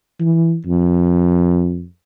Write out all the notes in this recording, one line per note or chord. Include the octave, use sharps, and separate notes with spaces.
E3
F2